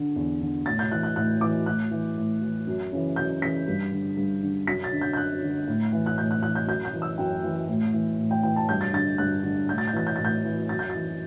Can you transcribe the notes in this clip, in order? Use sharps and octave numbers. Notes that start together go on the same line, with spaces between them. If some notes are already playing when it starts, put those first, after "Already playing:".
Already playing: D3
E2
D3
A2 A6
G6
E3 F#6
F#6
A2 F#6
E3 D6
A2 F#6
E3
A2
E3
F#2
C#3 E3
F#2 G6
C#3 E3 B6
G2
D3
G2
D3
F#2 B6
A6
D3
G6
G6
F#2 F#6
D3
A2
E3
F#6
A2 G6
F#6
E3 F#6
G6
F#2 G6
G6
E3
E6
F#2 G5
E3
A2
E3
A2
G5
E3 G5
A5
G2 G6
A6
D3 A6
G2 F#6
D3
A2 G6
A6
G6
E3 A6
G6
A2 A6
G6
E3
F#2 A6
G6
E3 A6